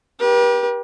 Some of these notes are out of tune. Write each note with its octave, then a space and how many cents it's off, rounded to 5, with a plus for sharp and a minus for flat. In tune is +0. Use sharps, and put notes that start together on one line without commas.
G4 +0 B4 -45